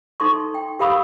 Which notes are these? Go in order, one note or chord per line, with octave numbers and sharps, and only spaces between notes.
D#4 A4 C6 C#6
G5
G4 A#4 F5 B5 D#6 E6